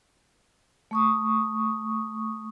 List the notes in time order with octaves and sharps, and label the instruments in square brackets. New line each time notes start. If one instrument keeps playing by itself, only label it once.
[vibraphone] A3 C#6 D#6